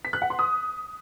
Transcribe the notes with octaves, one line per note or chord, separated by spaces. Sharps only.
B6
F#6
F#5
C6
D#6